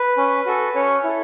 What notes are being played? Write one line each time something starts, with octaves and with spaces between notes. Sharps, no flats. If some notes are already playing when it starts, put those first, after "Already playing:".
Already playing: B4
C#4
F#4 A4
C#4 C#5
E4 A4